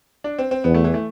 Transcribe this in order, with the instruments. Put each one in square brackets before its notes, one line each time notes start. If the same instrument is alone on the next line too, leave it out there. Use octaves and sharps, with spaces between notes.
[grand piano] D4
C4
C4
[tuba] E2 [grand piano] B3
[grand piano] A3
E3
A3